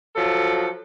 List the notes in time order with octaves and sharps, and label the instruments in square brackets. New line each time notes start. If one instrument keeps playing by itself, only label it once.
[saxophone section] F3 F#3 A4